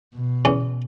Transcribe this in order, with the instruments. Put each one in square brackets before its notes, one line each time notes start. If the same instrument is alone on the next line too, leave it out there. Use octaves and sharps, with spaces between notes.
[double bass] B2
[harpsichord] E2 C#4